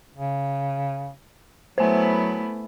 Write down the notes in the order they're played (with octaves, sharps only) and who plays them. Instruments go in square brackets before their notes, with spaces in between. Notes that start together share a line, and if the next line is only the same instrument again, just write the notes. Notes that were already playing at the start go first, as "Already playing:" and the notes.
[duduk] C#3
[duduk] F#3 [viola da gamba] A3 B3 E4 [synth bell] C5 G#5